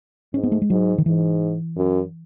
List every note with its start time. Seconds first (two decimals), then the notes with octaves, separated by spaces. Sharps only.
0.34 G#2 C#4
0.43 B3
0.52 A3
0.62 G#3
0.70 G#2 F#3
0.98 D#3
1.06 G#2 E3
1.76 F#2